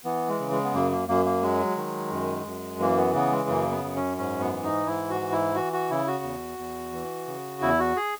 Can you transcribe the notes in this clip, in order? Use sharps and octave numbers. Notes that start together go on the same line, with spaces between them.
E3 B3
G#3
C#3
G#3
B3
F#2 A#3
A#3
F#2 A#3
A#3
F#3 G#3
D#3
F#2
F#2
E3 A#3
B3
C#3 B3
G#3
F#2 A#3
B3
F#2
C#4
G#2 C#4
B3
E3
D#4
G#2 E4
F#4
E3
E4
E3 F#4
F#4
C#3 E4
F#4
E2
E2
E3
C#3
E2 E4
F#4
G#4